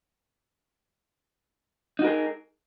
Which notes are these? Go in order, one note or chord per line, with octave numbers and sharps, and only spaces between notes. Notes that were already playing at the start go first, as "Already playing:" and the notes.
D#4 F#4 G#4 A#4